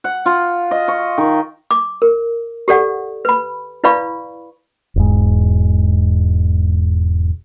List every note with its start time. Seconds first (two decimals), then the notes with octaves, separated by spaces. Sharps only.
0.04 F#5
0.26 F4
0.71 D#5
0.88 C#6
1.18 D#3
1.71 D6
2.02 A#4
2.68 G4 A4 D5 F#5
3.25 B4 B5
3.84 E4 B4 D5 F5 B5 C#6
4.96 E1 G#2